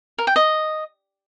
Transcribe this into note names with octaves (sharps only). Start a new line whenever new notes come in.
A#4
G5
D#5